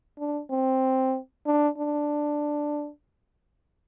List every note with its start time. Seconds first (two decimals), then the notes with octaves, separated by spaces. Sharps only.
0.19 D4
0.51 C4
1.46 D4
1.78 D4